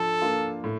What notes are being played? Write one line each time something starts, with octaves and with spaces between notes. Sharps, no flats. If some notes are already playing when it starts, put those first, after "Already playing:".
Already playing: F3 D4 A4
A#3 D4 F4
A2